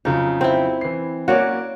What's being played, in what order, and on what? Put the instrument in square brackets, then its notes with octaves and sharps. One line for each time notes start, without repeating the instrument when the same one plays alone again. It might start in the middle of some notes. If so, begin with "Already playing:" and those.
[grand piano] F2 C#3 F#3 [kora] D#4
[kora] C4 E4
[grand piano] E3 C7
[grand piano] A#3 C#4 [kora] F#4 C#5 D5